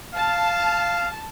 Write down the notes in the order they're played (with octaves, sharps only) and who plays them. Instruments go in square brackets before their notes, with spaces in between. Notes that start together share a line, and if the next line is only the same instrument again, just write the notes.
[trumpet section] F5 [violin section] A5